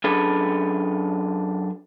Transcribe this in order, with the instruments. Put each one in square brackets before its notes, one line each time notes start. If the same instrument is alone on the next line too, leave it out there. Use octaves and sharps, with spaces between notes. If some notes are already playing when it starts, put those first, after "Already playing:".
[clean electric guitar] F#2 D4 G#4 A4 B4